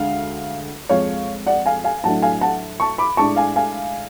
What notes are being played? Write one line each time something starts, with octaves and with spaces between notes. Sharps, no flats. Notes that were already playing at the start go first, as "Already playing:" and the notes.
Already playing: D2 D3 G#3 F5
F2 F3 G#3 C#5 F5
D5 F#5
F5 G#5
F5 G#5
A2 F#3 A3 D4 F#5 A5
F5 G#5
F#5 A5
A5 C#6
B5 D6
A2 G#3 D4 A5 C#6
F5 G#5
F5 G#5